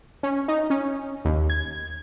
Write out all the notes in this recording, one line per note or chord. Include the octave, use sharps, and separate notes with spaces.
C#4
D#4
C#4
D#2
G#6